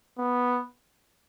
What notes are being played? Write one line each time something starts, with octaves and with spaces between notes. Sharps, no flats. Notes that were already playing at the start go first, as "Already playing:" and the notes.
B3